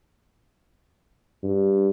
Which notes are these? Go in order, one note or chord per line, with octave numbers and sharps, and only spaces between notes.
G2